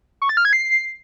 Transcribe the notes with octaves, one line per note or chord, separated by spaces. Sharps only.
C#6
A6
F6
G#6
C7